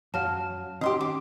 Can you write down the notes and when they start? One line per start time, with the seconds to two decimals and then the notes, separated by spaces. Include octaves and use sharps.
0.14 F#2 F#3 C#5 F5 F#5 A5 F6
0.81 D#3 C#4 G4 D#5 C6 D#6
1.01 D6